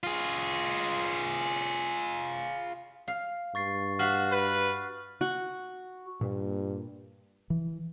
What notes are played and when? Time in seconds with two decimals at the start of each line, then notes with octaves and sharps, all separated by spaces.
0.03 F4 G#4
3.08 F5
3.55 G2 C#6 A6 C7
3.99 F#4 E5 F5 F6 F#6
4.32 B4
5.21 F#4
6.21 G2 A#2
7.50 E3